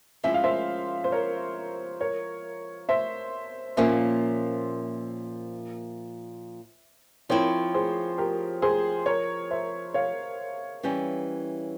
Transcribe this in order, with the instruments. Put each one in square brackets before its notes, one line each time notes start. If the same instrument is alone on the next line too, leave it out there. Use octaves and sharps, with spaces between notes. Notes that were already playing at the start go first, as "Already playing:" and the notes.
[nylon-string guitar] F3 G#3 C#4 E4 [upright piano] E5
[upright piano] F5
C5 E5
C5
A#4 C#5
A#4 C#5
C5 E5
[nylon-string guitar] A#2 F3 A#3 C#4 [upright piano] C5 E5
[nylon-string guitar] F3 C4 E4 [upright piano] A#4 C#5
[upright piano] G#4 C5
G4 A#4
G#4 C5
A#4 C#5
C5 E5
C#5 F5
[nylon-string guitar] E3 G3 C#4